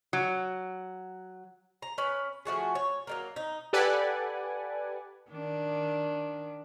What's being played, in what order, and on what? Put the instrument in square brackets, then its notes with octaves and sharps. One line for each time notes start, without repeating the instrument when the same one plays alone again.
[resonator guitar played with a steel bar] F#3
[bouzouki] A#5
C#4 B4
F3 A3 F#4 G#4
C#5
F#3 G3 A#3
D#4
[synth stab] G4 A4 B4 D5 F#5 G#5
[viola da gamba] D#3 D4